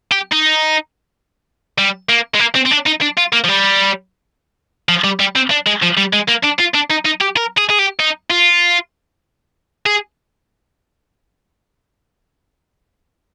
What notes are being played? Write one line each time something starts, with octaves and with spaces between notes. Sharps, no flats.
G4
D#4
G3
A#3
G#3
A#3
C4
C4
D4
D#4
D4
F4
A#3
F3
G3
F3
G3
G3
C4
D4
G#3
F3
G3
G#3
A#3
D4
F4
D4
D#4
D#4
G4
A#4
G#4
G#4
G4
D#4
F4
G#4